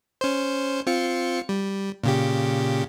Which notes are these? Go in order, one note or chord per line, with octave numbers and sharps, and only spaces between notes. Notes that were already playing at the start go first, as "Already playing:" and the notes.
C#4 C5
C4 F4 C#7
G3
A#2 C#3 G4